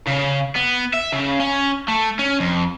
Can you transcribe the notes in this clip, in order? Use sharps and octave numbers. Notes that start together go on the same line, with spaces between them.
C#3
B3
E5
C#3
C#4
A3
C#4
F2